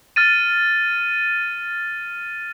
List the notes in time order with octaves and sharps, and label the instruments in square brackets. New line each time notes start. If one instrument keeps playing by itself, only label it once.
[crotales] F6 A6 D#7